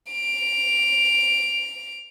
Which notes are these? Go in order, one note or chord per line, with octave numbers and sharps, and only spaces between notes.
D7 F7